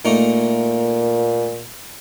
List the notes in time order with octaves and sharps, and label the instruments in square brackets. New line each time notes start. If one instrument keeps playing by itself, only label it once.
[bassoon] A#2 [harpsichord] A3 A#3 D#4